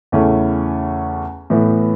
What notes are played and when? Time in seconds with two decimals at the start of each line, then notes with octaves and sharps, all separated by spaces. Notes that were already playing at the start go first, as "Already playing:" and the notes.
0.12 E2 C#3 A3 C#4 E4
1.50 A2 E3 B3 E4